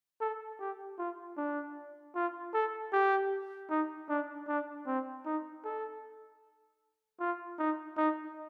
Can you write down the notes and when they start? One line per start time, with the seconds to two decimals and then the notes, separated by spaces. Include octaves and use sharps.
0.21 A4
0.60 G4
0.98 F4
1.37 D4
2.15 F4
2.54 A4
2.93 G4
3.70 D#4
4.09 D4
4.48 D4
4.87 C4
5.25 D#4
5.64 A4
7.20 F4
7.58 D#4
7.97 D#4